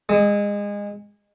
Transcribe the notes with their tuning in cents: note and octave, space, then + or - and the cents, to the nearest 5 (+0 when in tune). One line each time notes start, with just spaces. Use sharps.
G#3 -25 D#6 +35